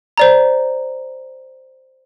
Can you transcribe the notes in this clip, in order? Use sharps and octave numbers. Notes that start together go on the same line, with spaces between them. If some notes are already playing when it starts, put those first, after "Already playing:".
C5 D5 A#5